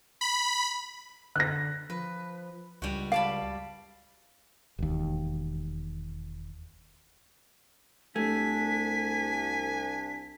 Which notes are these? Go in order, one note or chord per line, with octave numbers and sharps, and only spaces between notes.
B5
D3 F#6 A#6
F3 B4
C#2 G3 F#4
D5 F5 A5 B5
E1 D#2
C2 A3 D4 G#5 B6